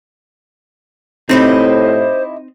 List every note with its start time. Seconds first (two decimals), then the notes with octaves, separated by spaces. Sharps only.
1.29 A2 C3 C4 D#4 E4 C5 D#5